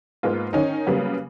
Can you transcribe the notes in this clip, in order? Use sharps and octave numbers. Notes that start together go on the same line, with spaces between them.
G#2 G#3 A#3 B3 F4
D#3 C#4 D#4
C#3 F#3 G3 A#3 B3